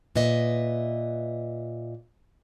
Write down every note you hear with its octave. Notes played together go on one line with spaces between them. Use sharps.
A#2 B4 D#5 E5